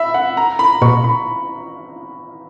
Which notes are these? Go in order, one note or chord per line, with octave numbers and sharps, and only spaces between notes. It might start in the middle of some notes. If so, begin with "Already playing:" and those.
Already playing: E5 B5
F#5
A#5
B5
A#2 C#6
B5